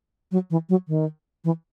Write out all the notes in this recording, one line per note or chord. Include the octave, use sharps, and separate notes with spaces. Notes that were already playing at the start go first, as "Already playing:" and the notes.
F#3
E3
F#3
D#3
E3